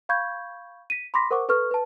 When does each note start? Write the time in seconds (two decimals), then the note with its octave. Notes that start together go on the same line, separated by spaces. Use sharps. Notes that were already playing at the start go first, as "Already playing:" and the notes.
0.09 F5 B5 C#6 G6 G#6
0.90 B6 D#7
1.14 B5 C6 D6 A#6 B6
1.31 A#4 C5 F#5 C#6 D6
1.49 A4 B4 C#6 F6
1.71 B4 A5